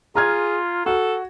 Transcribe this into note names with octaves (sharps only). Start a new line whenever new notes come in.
F4 G#4 A#5 F6 G#6
F#4 A4